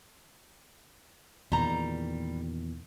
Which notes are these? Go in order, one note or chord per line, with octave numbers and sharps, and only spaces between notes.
E2 A#2 D#3 G3 A#5